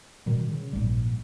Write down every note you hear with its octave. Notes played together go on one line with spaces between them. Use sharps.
B2 D#3 G3
C#3
A#1 G#2 G3